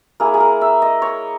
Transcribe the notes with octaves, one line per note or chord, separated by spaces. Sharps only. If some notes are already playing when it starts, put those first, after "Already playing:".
A#3 E4 G#4
G#4
A#4
E5
D#5
C#5